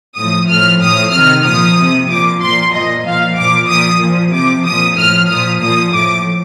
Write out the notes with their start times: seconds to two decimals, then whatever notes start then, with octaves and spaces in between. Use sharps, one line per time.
0.16 A2 F3 D#6
0.48 A2 F3 F6
0.80 A2 F3 D#6
1.13 C3 D#3 F6
1.45 A#2 F3 D#6
1.77 C3 F3
2.09 A#2 F3 D6
2.41 A#2 F3 C6
2.73 A#2 F3 D#5
3.05 A#2 F3 F5
3.36 A#2 F3 D6
3.68 A#2 F3 D#6
4.01 A#2 F3
4.33 C3 F3 D6
4.65 A#2 F3 D#6
4.97 A2 F3 F6
5.29 A#2 F3 D#6
5.61 A#2 F3 D#6
5.92 A2 F3 D6